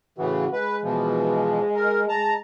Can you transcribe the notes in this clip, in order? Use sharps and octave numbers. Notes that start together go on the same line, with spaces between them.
A2 C#3 E3 F#4
G#3 B4
B2 E3 F3
A#4
G#3 A5 A#5